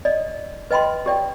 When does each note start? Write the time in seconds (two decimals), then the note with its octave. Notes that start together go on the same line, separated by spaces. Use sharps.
0.05 D5 D#5
0.71 B4 D#5 G5 B5 C6
1.06 G4 D5 G5